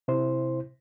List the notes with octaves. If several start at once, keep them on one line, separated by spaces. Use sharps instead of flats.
C3 E4 C5